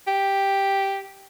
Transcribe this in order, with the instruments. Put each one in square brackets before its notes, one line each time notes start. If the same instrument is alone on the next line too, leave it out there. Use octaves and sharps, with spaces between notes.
[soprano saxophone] G4